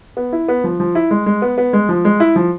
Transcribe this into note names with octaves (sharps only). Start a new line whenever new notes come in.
B3
E4
B3
F3
F3
E4
G#3
G#3
B3
B3
G#3
F3
G#3
E4
F3